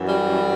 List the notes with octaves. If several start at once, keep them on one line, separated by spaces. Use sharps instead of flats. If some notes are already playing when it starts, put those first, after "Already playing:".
Already playing: F#2 E3
G3